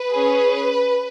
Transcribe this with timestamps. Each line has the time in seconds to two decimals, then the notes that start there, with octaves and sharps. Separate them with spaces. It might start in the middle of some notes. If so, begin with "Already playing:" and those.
Already playing: B4
0.11 C#4 G#4